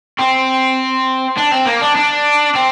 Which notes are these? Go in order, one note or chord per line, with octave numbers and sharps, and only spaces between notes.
C4
D4
C4
A#3
D4
D4
C4